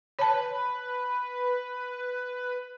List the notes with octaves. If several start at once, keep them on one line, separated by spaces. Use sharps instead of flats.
B4 C#5 A5